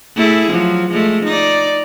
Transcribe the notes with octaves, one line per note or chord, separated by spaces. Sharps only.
A3 E4 G#4
F3 F#3
F3 G#3 A3
D#4 D5